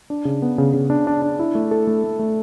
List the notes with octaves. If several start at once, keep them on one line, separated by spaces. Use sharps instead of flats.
D4
C#3
B3
C#3
C#3
D4
D4
D4
E4
A3
A4
A3
A3
A3